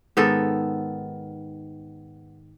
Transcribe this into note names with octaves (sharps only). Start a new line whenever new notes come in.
G#2 D#3 B3 A4